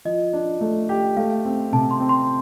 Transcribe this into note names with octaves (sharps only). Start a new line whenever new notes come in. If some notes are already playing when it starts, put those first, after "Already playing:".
F3 D#5
D4
A3
G4
A3 F5
C4
C3 A5
C6
C4
C6